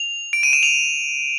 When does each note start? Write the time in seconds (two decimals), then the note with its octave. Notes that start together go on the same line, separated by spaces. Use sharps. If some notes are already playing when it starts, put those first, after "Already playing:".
Already playing: F7
0.33 D7
0.43 D#7
0.53 E7
0.63 F7